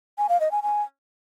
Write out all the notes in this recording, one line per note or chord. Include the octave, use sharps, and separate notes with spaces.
G#5
F5
D#5
G#5
G#5